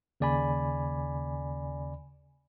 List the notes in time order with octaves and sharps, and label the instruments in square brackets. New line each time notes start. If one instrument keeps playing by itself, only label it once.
[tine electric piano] D#2 C#3 D5 G#5 B5